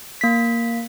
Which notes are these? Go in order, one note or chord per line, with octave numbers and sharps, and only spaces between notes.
A#3 B6